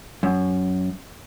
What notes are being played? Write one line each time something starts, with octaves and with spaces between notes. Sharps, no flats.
F#2